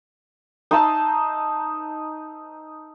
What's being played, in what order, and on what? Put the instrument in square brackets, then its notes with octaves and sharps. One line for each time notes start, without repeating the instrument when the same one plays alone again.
[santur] D#4 C5 A5 E6